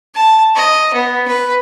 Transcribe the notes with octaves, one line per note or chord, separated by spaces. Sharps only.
A5
D#5
B3
B4